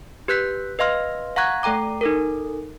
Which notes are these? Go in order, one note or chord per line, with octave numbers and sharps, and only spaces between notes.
G4 B4 F#6 G6 B6
B4 D#5 F5 C6 F6
F5 F#5 A#5 C#6 F#6 G#6
A3 A4 G5 A#5 D6
D#4 A4 A#4